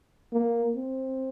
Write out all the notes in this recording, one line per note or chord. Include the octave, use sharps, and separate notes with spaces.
A#3
C4